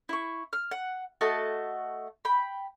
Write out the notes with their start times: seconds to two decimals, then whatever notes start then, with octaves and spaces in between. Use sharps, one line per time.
0.09 E4 C#6
0.53 F6
0.71 F#5
1.21 A3 F#4 D#5 A5
2.25 G5 B5